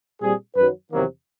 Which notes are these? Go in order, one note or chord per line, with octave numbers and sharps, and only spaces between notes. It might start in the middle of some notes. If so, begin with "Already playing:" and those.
A#2 G3 C4 G#4
F#2 D#3 F#3 B4
E2 C3 D#3 F#3 A#3